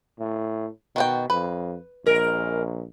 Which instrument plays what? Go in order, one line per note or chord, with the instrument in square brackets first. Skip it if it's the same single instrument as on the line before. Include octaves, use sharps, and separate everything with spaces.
[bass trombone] A2
[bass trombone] B2 [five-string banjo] D#3 F#4 G5
[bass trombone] F2 [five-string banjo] B4
[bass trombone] A#1 [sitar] G#3 A#4